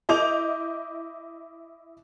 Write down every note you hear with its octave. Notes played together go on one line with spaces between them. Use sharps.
E4 D#5 D6 G6 F7